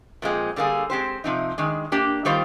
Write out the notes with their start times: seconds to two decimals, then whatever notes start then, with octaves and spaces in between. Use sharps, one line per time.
0.22 A#2 F3 G#3 C4
0.56 D3 G3 A#3 D#4 G#4
0.90 G#3 C4 G4 C5
1.24 C3 F3 C4 D#4
1.58 D#3 G#3 D4
1.92 A#3 D4 G4
2.25 D#3 G3 A#3 F4 C5